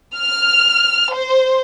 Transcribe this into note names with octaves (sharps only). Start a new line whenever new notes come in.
F6
C5